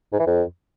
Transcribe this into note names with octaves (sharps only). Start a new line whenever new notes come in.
G#2
E3
F2